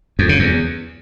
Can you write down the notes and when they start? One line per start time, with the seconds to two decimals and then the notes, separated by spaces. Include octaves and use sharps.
0.19 F2
0.29 C#3
0.39 E2